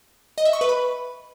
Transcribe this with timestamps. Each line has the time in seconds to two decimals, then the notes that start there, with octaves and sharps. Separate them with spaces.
0.38 D#5
0.45 E5
0.53 C#6
0.61 B4
0.69 B5